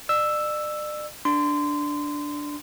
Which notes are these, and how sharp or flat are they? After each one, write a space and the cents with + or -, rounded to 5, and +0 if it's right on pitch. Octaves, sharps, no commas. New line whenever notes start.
D5 +40 E6 +0
D4 +0 C6 -25